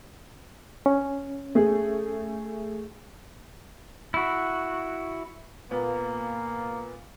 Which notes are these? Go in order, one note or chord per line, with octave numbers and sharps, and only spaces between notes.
C#4
A3 G#4
E4 F#4
A#2 A#3 B3